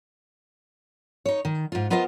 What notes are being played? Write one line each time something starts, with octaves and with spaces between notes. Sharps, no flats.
D#4 C#5
D#3
G#2 F4
B3 F4 A#4 C5 D#5 F5